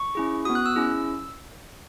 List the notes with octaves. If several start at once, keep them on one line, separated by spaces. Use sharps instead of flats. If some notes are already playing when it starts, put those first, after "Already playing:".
Already playing: C#6
C#4 E4 G#4
B3 F#4 D#6
F#6
E6
C#4 E4 G#4